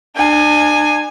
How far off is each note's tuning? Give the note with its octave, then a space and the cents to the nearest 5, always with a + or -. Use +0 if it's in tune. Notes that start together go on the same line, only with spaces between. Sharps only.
D4 +35 G#5 +0